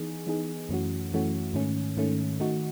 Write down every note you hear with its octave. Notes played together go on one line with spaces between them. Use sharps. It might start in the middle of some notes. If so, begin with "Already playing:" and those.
Already playing: E3 B3 D#4 G#4
E3 B3 D#4 G#4
F#2 E3 A3 C#4 F#4
F#2 E3 A3 C#4 F#4
G#2 D#3 A3 C#4
G#2 D#3 A3 C#4
D#3 A3 D#4 F#4